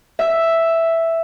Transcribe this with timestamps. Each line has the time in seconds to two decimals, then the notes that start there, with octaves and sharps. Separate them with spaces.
0.19 E5